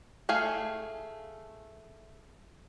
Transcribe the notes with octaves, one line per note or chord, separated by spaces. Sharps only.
A3 G#4 F5 G#5